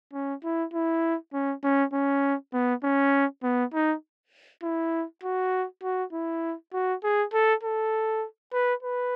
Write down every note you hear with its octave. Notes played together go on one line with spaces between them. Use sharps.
C#4
E4
E4
C#4
C#4
C#4
B3
C#4
B3
D#4
E4
F#4
F#4
E4
F#4
G#4
A4
A4
B4
B4